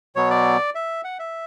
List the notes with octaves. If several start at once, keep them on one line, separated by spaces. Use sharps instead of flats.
B2 F#3 B3 C#5
D5
E5
F#5
E5